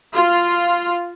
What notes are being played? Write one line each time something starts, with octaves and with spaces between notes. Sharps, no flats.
F4